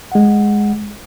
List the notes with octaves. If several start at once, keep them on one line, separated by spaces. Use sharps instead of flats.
G#3 F#5